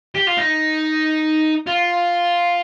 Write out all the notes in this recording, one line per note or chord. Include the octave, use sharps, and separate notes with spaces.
G4
F4
D#4
F4